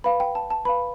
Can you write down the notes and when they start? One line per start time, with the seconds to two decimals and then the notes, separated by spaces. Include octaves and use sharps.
0.04 B4 F5 B5
0.20 G5
0.35 A5
0.50 A5
0.65 B4 F5 B5